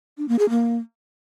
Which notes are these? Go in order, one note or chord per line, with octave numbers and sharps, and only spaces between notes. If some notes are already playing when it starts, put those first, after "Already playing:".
D4
A#3
G#4
A#3